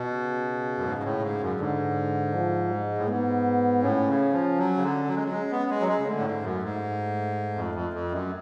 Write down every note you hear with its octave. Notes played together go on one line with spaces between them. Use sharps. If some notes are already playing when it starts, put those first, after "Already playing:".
Already playing: B2
C#3
F#2
G#2 C#3
G#2
A2
G#2
F#2
G#2 D3
F3
G#3
A2
G#2 B3
A2 C#4
C#3
F3
F#3
C#3
D3
F#3
G#3
F#3
G#3 C#4
B3
G#3
F#3
G#3
C#3
D3 A3
A2
G#2
F#2
G#2
F2
F2
F2
F#2